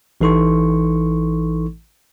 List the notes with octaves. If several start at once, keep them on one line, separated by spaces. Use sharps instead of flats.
A1 E3 D#4 A4 C6 C#6